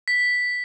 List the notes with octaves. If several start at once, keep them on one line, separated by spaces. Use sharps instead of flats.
B6